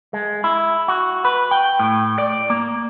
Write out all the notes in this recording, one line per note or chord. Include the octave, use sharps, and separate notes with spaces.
G#3
E4
F#4
B4
G5
A2
D5
A#3